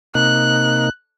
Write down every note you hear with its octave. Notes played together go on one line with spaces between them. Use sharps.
C3 A#3 D#4 F#6